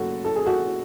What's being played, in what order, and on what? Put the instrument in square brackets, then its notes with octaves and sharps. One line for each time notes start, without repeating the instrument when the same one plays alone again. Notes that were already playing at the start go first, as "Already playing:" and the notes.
Already playing: [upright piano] F#2 C#3 F#4 A4
A4
G#4
F#4 A4